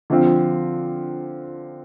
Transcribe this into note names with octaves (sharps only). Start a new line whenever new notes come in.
D3 F3 C4 F4